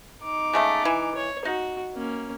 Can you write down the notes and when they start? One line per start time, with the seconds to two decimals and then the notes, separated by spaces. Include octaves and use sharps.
0.23 D#4 D6
0.53 C#3 G#3 A3
0.85 E3 G#5
1.15 C#5
1.45 D#4 F#4
1.95 A#3 C#4